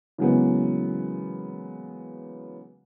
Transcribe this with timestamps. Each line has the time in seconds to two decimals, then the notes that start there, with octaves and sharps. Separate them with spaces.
0.18 C#3 E3 F#3 G#3 A#3 B3